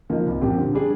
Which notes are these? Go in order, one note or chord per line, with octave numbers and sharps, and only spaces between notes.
F3 A#3 D#4
C2
A#2 F3 C4 G4
D3
G3 D4 G#4